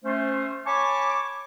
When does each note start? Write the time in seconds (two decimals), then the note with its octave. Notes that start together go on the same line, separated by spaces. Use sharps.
0.05 A3 C#4 C5
0.66 C#5 G#5 A5 B5 C#6 D6